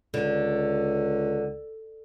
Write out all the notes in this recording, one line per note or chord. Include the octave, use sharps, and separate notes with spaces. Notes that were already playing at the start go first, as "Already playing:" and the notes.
C#2 D3